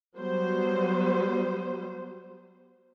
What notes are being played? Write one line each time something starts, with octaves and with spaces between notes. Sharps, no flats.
F#3 G3 B3 C5